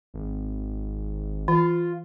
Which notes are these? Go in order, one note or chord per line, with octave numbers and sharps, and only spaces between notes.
G#1
E3 F4